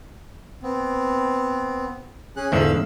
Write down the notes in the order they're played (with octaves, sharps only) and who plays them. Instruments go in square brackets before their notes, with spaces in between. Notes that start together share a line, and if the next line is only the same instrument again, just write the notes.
[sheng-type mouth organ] B3 C4
C#4 G#4 F#6
[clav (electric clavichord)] E2 G#2 D3 [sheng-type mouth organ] E5 F5 E6